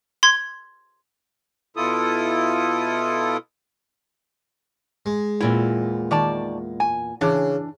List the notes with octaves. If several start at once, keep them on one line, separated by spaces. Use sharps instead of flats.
C6 G#6
B2 E4 F4 A4 D#6
G#3
E2 A#2 C4 E4
D#3 D5 A5
G#5
C#3 E3 D4